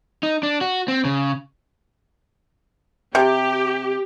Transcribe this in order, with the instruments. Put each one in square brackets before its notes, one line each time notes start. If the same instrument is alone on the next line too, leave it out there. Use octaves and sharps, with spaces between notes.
[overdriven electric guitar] D#4
D4
F#4
C4
C#3
[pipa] C3 [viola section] G4